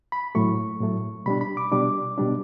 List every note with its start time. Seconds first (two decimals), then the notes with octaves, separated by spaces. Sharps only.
0.12 B5
0.35 A2 F#3 A3 C#6
0.80 A2 F#3 A3
1.26 B2 G3 D4 B5
1.41 B5
1.57 D6
1.71 B2 G3 D4 D6
2.18 B2 G3 D4